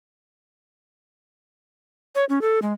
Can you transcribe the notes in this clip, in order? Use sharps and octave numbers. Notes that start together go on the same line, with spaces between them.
C#5
C#4
A4
G#3